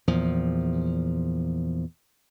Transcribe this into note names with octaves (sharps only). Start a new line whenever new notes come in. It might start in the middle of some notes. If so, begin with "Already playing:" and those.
E2 A#2 F3